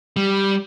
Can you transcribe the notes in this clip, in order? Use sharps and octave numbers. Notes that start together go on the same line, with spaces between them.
G3